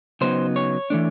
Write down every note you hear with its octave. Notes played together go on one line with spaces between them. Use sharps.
C#3 F#3 B3 D#4 C5
C#5
E3 A3 D4